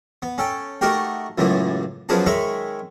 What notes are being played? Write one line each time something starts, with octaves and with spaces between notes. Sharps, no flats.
B3
C#4 A4 G5
A3 D#4 F#4 G4 A#4 G5
C#2 F#2 A2 E3 B3
F#2 F3 B3 G#4 B4 A5
D#3 G#3 C#5 E5 B5 C#6